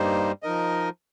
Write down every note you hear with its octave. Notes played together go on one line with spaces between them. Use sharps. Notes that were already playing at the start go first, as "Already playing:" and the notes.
Already playing: G2 G3 A#3 D#4 C5
F3 D#4 A#4 D#5